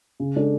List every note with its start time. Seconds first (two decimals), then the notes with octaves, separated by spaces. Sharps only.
0.20 C#3
0.35 G#3 D4 A4